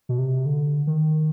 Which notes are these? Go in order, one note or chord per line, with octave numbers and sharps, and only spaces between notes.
B2
C3
D3
D#3